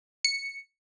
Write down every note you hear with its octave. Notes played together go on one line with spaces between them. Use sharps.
C#7